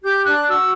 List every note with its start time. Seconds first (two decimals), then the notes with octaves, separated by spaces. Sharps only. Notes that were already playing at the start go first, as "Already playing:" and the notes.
0.02 G4 G6
0.25 D4 F#6
0.47 F#4 E6